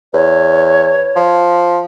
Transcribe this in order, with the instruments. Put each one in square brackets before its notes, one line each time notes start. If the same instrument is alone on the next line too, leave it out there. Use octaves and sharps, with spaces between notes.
[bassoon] E2 [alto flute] C#5
[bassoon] F3